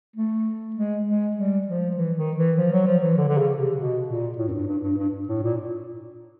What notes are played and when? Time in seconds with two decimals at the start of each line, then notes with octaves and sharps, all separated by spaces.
0.16 A3
0.77 G#3
1.07 G#3
1.37 G3
1.68 F3
1.97 E3
2.17 D#3
2.37 E3
2.58 F3
2.73 F#3
2.87 F3
3.03 E3
3.17 D3
3.28 D3
3.38 C#3
3.58 C3
3.78 B2
4.08 A#2
4.38 A2
4.48 F#2
4.53 G2
4.67 G2
4.83 G2
4.98 G2
5.29 A2
5.43 A#2